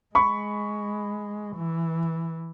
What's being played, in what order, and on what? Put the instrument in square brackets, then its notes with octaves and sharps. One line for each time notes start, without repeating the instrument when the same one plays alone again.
[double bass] G#3 [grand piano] B5 C#6
[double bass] E3